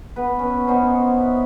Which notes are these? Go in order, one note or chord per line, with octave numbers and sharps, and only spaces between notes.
B3 B4
C#4
B3 C#4 D#4 C5
E5